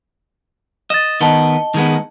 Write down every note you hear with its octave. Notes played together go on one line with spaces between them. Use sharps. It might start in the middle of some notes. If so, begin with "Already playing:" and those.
D#5 A6 E7
D#3 B3 D#5 A5 G7
D#3 G#3 B3